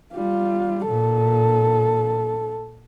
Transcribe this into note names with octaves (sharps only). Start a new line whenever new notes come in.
G3 F4
A#2 A4